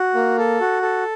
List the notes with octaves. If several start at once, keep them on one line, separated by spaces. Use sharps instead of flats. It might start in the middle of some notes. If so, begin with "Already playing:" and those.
Already playing: F#4
A#3
A4
F#4
A4